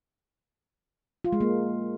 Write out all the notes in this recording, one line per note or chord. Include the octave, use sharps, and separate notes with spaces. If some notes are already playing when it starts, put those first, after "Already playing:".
F4
G#3
A#3